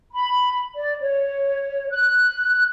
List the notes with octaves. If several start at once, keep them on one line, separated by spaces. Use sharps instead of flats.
B5
D5
C#5
F#6